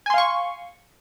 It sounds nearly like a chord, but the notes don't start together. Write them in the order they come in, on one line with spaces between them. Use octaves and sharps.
G#5 C6 F5 C#6